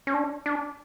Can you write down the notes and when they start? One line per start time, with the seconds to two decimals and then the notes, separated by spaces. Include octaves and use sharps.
0.07 C#4
0.14 D4
0.46 D4